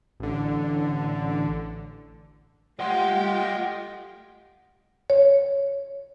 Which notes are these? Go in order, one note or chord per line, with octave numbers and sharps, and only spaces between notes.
A1 D3
A3 F4 G4 D#5 F#5 G5 C6
F#5
C#5